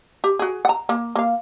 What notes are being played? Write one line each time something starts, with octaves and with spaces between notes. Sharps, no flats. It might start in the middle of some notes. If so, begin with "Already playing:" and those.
G4
F#4 G#4
F#5 A#5
A#3
A#3 F5